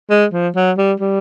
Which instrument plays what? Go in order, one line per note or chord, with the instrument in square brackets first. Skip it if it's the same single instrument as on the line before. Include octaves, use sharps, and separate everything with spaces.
[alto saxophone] G#3
F3
F#3
G3
G3